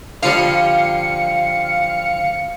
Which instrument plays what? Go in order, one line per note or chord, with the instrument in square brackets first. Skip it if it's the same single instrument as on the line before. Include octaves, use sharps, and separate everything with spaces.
[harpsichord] D3 F3 G3 [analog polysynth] F5 C#7